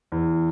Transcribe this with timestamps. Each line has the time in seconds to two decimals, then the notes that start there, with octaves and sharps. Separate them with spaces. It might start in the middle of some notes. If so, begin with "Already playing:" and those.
0.12 E2